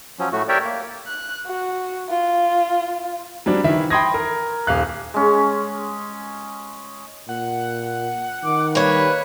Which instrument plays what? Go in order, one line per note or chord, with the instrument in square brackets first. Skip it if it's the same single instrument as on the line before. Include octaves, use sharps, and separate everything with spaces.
[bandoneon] F3 F#3 C#4
A2 A3 F#4
G4 A#4 C#5 D5 E5 G5
A#3
[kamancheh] F#6
F#4
F4
[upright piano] F#3 G3 C4 D4
D#3 E3 E4 E5
G5 B5 C6 D#6 G#6 A#6
A#4
D#1 F5 F#6
[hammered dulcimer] G#3 C#4
[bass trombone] A#2 [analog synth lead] F#5
[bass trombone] D#3 [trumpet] D6
[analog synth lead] G3 [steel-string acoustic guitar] A#3 C#5 [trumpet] B4